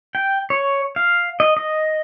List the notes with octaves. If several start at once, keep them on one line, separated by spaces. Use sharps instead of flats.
G5
C#5
F5
D#5
D#5